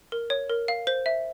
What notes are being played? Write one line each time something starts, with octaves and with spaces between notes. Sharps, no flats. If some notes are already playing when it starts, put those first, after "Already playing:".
A#4
C#5
A#4
F5
C5
E5